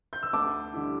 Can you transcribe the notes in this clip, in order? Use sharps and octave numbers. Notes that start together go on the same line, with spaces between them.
G6
E6
D2 A5 D6
D3 G3 E4